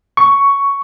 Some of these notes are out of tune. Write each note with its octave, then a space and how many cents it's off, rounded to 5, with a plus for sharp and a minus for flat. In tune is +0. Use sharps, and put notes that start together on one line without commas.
C#6 +10